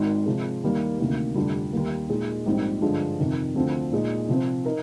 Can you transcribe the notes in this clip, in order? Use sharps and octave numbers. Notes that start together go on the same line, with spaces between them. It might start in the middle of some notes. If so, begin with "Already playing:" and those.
Already playing: G#1 G#2 D#3
C3 F3 G#3
D#2 D#3 G3 A#3
D2 C3 D#3 A#3
F1 F2 D3 G3
D#2 D#3 G3 A#3
A#2 G#3 D#4
A#1 G#2 G3 C4 D#4
G2 D3 F3 G#3
F2 C3 D#3
D2 D3 F3 C4
A#2 G#3 D#4
C3 F3 C4
D#4 A#4